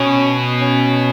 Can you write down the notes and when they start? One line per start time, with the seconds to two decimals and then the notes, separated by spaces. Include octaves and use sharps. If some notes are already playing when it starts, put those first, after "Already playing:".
Already playing: B2 C#4
0.60 C#4